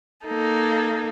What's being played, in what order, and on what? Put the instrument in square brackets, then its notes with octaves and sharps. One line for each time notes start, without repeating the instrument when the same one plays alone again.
[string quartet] A#3 D#4 A4